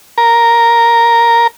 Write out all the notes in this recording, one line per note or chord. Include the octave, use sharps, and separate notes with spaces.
A#4